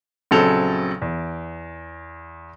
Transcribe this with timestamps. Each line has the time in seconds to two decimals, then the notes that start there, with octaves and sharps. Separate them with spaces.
0.31 A#1 C#3 F#3 C4 A4 F7
1.02 E2